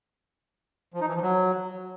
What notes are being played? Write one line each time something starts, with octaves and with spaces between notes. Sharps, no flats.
F3
D#4
E3
F3
F#3